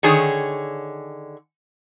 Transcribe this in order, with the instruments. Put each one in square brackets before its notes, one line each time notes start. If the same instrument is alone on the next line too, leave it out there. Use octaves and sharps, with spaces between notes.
[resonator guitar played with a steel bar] D3 D#3 G#4 C#5